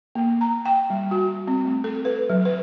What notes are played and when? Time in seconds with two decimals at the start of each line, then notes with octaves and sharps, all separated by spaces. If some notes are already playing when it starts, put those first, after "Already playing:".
0.15 A#3
0.41 A#5
0.66 G5
0.90 G3
1.11 F#4
1.48 C4
1.65 A3
1.84 A4
2.05 B4
2.30 F#3
2.45 B4